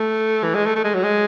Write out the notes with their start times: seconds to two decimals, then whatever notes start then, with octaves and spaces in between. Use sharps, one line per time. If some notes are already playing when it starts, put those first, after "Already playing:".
Already playing: A3
0.44 E3
0.55 G#3
0.65 A3
0.76 A3
0.84 G#3
0.94 F#3
1.04 G#3